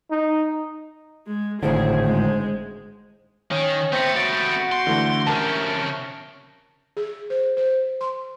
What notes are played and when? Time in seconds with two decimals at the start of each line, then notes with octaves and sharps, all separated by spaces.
0.11 D#4
1.27 G#3
1.63 G#1 A2 D3 G#4 C5
2.04 G#3
3.51 D#3 C#4
3.93 A3 B3 C4 G6 A#6 C#7
4.16 F#4 A6 D7
4.72 C6
4.87 D3 E3 A3 G7
5.27 C3 C#4 A#4 E5 A5
6.97 G#4
7.30 C5
7.57 C5
8.01 C6